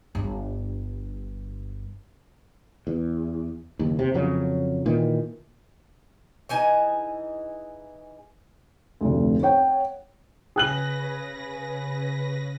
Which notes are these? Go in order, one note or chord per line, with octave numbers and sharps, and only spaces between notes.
G1 G2
E2
F#1 D#2
C3
F2 C#3 F#3
A#2 D#3 E3
E3 D#4 G#4 G#5
F1 D2
C#5 F#5 G5
C#3 G#4 B4 F#6 A#6 F#7